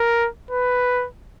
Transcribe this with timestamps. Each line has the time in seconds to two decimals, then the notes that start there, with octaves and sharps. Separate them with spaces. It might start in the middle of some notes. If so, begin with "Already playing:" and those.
Already playing: A#4
0.51 B4